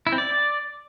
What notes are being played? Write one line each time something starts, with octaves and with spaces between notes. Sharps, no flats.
E4
C4
D5